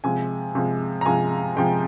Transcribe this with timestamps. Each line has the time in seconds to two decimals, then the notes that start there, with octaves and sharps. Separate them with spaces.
0.04 C3 F3 G#3 G#5
0.55 C3 F3 G#3
1.01 A#5
1.06 C3 F3 G#3 G#5
1.56 C3 F3 G#3 G5